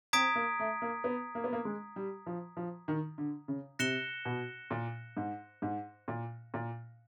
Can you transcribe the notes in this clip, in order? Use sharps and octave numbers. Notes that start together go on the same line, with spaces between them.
C4 A#5 D#6 G#6 B6 D7
A#3
A3
A#3
B3
A#3
B3
A#3
G#3
G3
F3
F3
D#3
D3
C#3
C3 F#6 A#6 C#7 E7 G7
B2
A#2
G#2
G#2
A#2
A#2